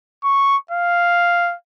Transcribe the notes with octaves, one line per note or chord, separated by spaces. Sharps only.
C#6
F5